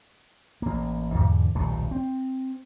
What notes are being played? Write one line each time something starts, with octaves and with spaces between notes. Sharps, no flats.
A1 A#3
E2 G#2 D3
D#1 B1 B2 A3
C4